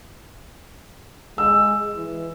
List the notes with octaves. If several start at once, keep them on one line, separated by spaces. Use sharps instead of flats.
G#3 E6
E3